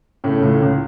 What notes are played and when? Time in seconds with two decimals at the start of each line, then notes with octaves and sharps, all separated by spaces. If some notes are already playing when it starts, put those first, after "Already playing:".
0.24 A2 C#3 A3
0.42 C#2 A2 A3
0.62 C#2